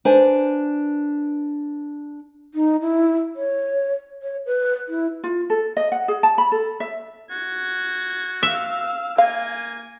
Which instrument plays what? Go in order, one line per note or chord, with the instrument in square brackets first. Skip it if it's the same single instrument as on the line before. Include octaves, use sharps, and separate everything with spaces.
[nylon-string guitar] D4 B4 C5 G#5
[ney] D#4
E4
C#5
C#5
B4
E4
[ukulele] F4
A4
D#5
F#5
G#4
A5
B5
A4
E5
[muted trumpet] F#4 [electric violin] G#6
[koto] E5 [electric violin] F5 E6
[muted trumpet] A#3 [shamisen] F5 [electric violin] G#5